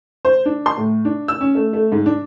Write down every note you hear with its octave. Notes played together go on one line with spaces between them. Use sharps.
C5
D4
C6
A2
D4
E6
C#4
A3
A3
G#2
D4